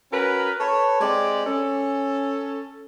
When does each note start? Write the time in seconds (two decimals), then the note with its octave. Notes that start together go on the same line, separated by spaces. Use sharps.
0.12 C#4 F#4 A#4 B4
0.60 A4 B4 C#5
1.01 G#3 C4 G4 D5
1.46 C#4 A4